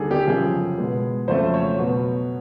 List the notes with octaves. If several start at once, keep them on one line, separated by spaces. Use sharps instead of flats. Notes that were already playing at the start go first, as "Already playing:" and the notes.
Already playing: D#2 D3 G3 G#4 A4
G4
F#2 C#3 F3 G#4
B2 G#3 B3
F2 C#3 F#3 A3 C5
C#5
B2 F#3 B3